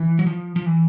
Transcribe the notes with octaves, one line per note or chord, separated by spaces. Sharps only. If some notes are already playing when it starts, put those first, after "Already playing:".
Already playing: E3
F#3
F3
F3
E3